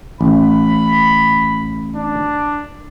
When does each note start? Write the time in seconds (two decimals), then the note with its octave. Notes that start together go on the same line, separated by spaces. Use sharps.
0.21 A1 B5
1.96 D4